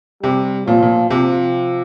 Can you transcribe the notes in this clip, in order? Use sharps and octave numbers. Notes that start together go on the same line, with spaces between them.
C3 G3
A#2 F3
A#2
C3 F3